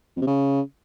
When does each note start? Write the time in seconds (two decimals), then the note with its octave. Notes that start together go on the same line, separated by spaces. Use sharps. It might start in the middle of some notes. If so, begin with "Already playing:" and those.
0.16 F2
0.22 C3
0.27 C#3